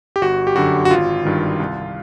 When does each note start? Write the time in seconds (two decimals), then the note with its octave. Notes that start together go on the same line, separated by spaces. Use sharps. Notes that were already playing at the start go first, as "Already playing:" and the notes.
0.16 G4
0.21 G1 F#4
0.47 G4
0.56 F#2 D3 F#4
0.85 F#4
0.90 G#1 F4
1.25 G2 D#3
1.60 C2